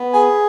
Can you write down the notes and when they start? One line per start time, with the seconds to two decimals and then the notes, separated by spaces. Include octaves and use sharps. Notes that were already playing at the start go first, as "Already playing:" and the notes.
Already playing: B3
0.13 G#4 G#5